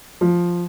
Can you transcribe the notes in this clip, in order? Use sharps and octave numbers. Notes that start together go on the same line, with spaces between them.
F3